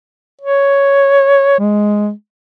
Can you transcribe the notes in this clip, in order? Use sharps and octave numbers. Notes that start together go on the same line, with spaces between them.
C#5
G#3